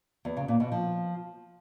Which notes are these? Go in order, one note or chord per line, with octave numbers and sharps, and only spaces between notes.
E2
C#3
A#2
B2
F3